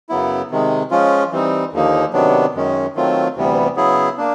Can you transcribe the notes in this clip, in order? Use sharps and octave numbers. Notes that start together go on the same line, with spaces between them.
F#2 C#3 F#3 B3 E4
C3 D#3 G#3
F3 G#3 C#4 F4
E3 G3 C4 D#4
D#2 D3 F3 A#3 D#4
C3 D#3 F#3 B3 D4
F#2 D#3 G#3 C#4
D#3 F#3 A3 C4 F4
D2 C3 E3 G3 B3
C#3 F#3 B3 E4 G#4
A#3 D4